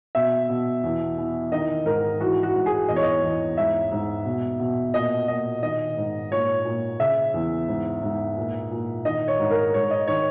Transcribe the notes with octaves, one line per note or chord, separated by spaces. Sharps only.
B2 E5
B2
E2
E3
D#3 D#5
G#2 A#4
E3 F#4
F#4
G#2
G#4
E2 D#5
C#5
D#5
E2
G#2 E5
G#2
B2
B2
A#2 D#5
A#2 D#5
D#3 D#5
G#2
A#2 C#5
A#2
C#3 E5
E2
G#2
G#2
A#2
A#2
D#3 D#5
C#5
G#2
A#4
G#2 C#5
D#5
D#3 C#5